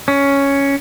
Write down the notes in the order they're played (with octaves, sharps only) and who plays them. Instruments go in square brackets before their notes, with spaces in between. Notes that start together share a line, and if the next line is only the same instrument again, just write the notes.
[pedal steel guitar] C#4